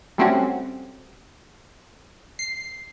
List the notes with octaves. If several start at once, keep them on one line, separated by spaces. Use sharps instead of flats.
G3 A3 C4 C#4 F#4 G4
C7